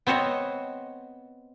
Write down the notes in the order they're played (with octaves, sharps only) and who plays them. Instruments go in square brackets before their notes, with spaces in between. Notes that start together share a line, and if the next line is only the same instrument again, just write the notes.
[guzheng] B3 C4 C5 C#5 D#5